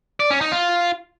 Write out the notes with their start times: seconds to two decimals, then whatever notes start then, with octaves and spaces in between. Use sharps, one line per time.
0.20 D5
0.31 C#4
0.41 D#4
0.52 F4